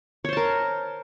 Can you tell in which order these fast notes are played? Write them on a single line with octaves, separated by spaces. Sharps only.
C#5 C5 A5 A#4